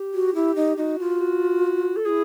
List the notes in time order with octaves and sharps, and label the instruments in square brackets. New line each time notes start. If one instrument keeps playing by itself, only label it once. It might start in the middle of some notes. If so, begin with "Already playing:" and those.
Already playing: [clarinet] G4
[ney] F#4
[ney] E4 [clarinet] G4
[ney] D#4
[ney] D#4 [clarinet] F#4
[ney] F4
[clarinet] F#4
A4
[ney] E4 F4 [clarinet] G#4